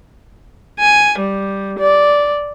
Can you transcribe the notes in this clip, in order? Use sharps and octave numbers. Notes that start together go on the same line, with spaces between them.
G#5
G3
D5